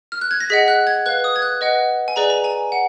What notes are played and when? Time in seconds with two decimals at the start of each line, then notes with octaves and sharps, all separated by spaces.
0.12 F6
0.21 F#6
0.31 G#6
0.40 A#6
0.50 G#4 D#5 F#5 B6
0.68 F#6
0.87 G#6
1.06 B4 F5 F#6
1.24 D#6
1.36 G#6
1.42 F#6
1.61 B4 D#5 F#5
2.08 G#5
2.16 G#4 B4 D5 A#5
2.30 A#5
2.44 G#5
2.72 F#5